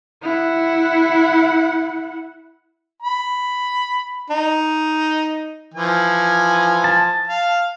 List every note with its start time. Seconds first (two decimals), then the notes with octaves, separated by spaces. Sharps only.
0.22 E4 F#5
3.02 B5
4.30 D#4
5.74 E3 F3 G#5
6.84 A5
7.27 F5